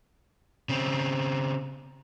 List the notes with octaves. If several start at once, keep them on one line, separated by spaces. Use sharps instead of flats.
C#3 C4